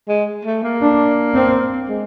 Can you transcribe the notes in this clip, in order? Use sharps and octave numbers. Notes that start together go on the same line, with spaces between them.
G#3
A3
A#3
D4
C4
G#3